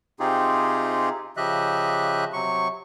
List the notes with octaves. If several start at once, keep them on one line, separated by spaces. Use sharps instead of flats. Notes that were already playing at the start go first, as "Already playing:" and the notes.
C3 C4 D#4 F4 G4 G#4
C#3 F3 G4 D#5 E5 F#6
C3 F#3 C#6